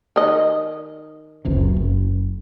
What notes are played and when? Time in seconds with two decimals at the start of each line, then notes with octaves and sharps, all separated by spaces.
0.16 D#3 D#5
1.45 F#1 C#2 C3
1.76 F#1